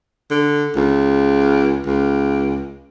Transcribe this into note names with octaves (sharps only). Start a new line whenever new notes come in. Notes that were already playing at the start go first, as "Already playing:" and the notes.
D3
C#2
C#2